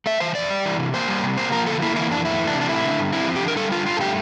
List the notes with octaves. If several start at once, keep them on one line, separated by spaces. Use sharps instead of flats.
A3 E5
E3 C5
F2 D5
G3
E3
C3
A#3 C5
G3
C3
A#3 C5
F3 A#4
D3 A4
A#3 E4
E3 E4
F2 D4
A3 E4
E3
D4
C3
D4
A3 E4
D3
G2
C4 E4
F3
G4
D3
A#4
G3 A4
D3 F4
G2 F4
A4
A3 G4